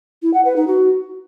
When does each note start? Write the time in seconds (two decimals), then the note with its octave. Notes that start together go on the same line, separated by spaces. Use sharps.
0.22 E4
0.33 F#5
0.45 B4
0.56 D#4
0.67 F#4